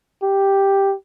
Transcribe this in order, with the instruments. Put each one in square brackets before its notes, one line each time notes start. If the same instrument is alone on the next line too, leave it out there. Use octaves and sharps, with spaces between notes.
[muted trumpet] G4